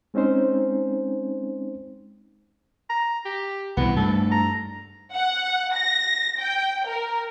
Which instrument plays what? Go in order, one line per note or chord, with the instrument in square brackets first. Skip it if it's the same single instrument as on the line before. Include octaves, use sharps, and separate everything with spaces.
[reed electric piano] G#3 C4 C#4 D#4 C5
[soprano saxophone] A#5
G4
[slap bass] C2 B2 E3 [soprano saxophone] B3
[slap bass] G2 A3 [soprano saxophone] A4
[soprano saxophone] A#5
[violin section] F#5
A#6
G5
A#4